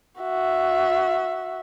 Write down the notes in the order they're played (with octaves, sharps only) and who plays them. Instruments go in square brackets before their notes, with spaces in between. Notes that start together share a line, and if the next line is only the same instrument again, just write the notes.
[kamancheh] F#4 E5